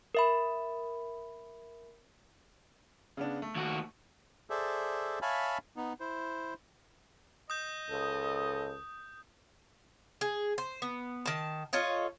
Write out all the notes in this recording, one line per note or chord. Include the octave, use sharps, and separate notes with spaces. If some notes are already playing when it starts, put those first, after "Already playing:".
A#4 E5 B5
C#3 B3 D4
A3
D#2 F#4
G#4 A4 C5 D5 E5
C#5 E5 F5 G#5 A5 B5
B3 D#4
E4 C5
D#5 D#6 G6
C#2 A4
G#4
C5
B3
D#3 A5
F4 A4 C#5 D#5